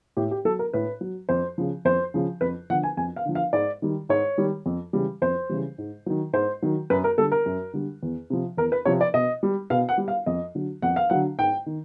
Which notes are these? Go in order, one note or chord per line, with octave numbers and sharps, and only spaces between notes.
A2 G4
G4
F#3 A4
A#4
A2 B4
F#3
F2 C5
C#3 F3
F2 C5
C#3 F3
F2 B4
D3 F3 F#5
G#5
F2 G#5
F5
D3 F3
F5
G#2 D5
D#3 G3
G#2 C#5
D#3 G3
F2
C#3 E3 G3
F2 C5
C#3 E3 G3
G#2
D#3 F#3
G#2 C5
D#3 F#3
F#2 B4
A#4
D3 G3 A4
A#4
F#2
D3 G3
E2
C3 F3
E2 A#4
B4
C3 F3 C#5
D5
B2 D#5
G3
B2 F5
F#5
G3
F5
F2 D#5
D3 F#3
F2 F#5
F5
D3 F#3 F#5
G#2 G5
D#3